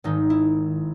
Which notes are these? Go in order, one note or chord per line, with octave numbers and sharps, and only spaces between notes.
G#1 G#2 D#3 D#4
E4